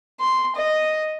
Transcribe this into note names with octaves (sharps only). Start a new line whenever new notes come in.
C6
D#5